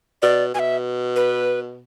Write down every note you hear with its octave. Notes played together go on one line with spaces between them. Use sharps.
B2 D5
B2 E5 G#5
B4